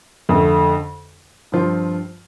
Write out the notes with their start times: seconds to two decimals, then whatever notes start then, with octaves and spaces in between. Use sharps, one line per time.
0.29 F2 D3 A3
1.52 G2 F3 C4 F4